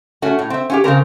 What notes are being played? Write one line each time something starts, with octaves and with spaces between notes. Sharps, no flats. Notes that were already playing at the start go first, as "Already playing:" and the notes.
A3 C#4 F#4
A2
C4 E5
C#4 F4 G4
C#3 G#3 C4 A#4